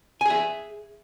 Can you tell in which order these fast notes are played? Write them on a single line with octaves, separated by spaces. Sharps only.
G#5 G#4 E5